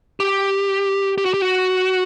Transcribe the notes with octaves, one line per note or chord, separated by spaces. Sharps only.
G4
G4
F#4
G4
F#4